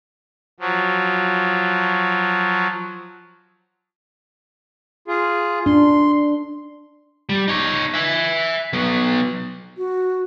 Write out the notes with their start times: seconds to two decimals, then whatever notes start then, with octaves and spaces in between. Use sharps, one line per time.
0.60 F3 F#3
5.08 F4 G#4
5.66 D4 C6
7.29 G3
7.48 D#4 C#5
7.94 E5 G#5
8.73 F#3 B3
9.77 F#4